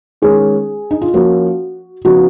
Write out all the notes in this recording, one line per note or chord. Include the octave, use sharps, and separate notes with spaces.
D#3 G#3 C#4 G#4
D#4
F4
F3 A#3 C#4 F#4
C#3 F3 B3 D#4 F#4